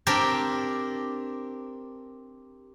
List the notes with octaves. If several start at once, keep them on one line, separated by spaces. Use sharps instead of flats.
C4 D4 G4 A#4 G5 A5